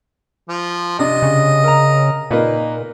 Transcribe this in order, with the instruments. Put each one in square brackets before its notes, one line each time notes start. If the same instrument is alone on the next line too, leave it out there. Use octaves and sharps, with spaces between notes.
[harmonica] F3
[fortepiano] C3 D4 [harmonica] D#5
[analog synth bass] C#3
[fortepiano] A#4 A#5
[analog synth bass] A#2 [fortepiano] A#3 D#4 B4